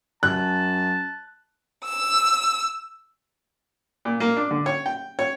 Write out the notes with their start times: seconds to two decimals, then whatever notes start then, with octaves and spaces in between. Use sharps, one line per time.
0.23 F#2 A5 F#6
1.83 E6
4.05 A#2
4.20 A#3
4.37 D4
4.51 D3
4.66 C#5
4.86 G5
5.19 C#5